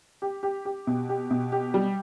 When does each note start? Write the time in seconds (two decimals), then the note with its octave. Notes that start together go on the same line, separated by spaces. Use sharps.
0.22 G4
0.43 G4
0.65 G4
0.87 B2
1.09 G4
1.31 B2
1.52 G4
1.74 G3